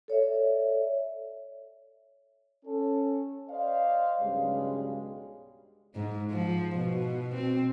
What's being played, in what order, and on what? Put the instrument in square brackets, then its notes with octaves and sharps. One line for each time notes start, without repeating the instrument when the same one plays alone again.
[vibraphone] A4 C#5 D5 E5
[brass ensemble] C#4 A4
C5 D5 D#5 F5
B1 G2 C#3 G3 G#3
[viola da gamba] G#2
F3
B2
C4